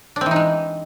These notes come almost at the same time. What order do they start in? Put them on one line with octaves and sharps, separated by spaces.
D4 C4 E3 D#4 G#3